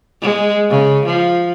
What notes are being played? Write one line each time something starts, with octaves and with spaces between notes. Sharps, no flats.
G#3
C#3
F3